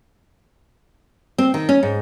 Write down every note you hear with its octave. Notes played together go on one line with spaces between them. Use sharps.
C4
D#3
C#4
G#2